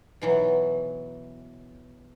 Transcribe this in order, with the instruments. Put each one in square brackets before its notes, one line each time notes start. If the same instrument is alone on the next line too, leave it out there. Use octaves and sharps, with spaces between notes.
[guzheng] B2 E3 F#3